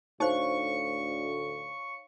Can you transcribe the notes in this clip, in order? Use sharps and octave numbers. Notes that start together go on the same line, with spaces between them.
D2 A2 D#4 C5 C#5 F5 C#6